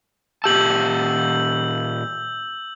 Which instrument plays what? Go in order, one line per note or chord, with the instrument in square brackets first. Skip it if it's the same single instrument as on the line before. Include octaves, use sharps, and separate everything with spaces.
[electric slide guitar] A#2 G4 A5 [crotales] E6 G6 F#7